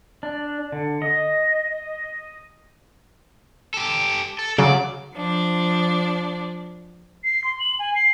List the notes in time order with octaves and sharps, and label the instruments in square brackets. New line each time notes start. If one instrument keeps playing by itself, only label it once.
[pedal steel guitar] D4
D3
D#5
[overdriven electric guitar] G4 A4
A4
[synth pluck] C#3 F#3 [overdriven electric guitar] D5
[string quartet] F3 D4
[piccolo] C7
C6
F#7
G#5
C7